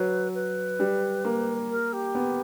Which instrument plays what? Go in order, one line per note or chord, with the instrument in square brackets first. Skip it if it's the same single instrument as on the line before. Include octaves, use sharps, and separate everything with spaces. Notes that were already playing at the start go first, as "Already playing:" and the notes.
Already playing: [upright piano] F#3 [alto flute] B4
[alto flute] B4
[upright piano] G3
A#3
[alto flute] A#4
G4
[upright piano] B3